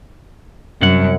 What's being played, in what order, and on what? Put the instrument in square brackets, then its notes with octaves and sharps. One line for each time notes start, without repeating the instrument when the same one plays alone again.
[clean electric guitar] C2 C#4 F#5 [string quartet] F#2